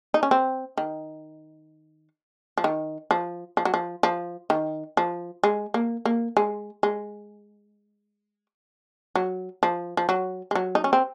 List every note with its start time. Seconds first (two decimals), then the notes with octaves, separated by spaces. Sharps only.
0.14 D#4
0.23 C#4
0.31 C4
0.77 D#3
2.58 F3
2.64 D#3
3.11 F3
3.57 F3
3.65 F#3
3.74 F3
4.03 F3
4.50 D#3
4.97 F3
5.43 G#3
5.74 A#3
6.05 A#3
6.37 G#3
6.83 G#3
9.15 F#3
9.63 F3
9.97 F3
10.09 F#3
10.51 G#3
10.55 F#3
10.75 D#4
10.84 C#4
10.93 C4